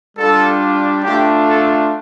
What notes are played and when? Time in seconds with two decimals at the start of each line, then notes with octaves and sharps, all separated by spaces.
0.17 G3 D4 F4 A4
1.03 A3 D4 F4 G4
1.47 A4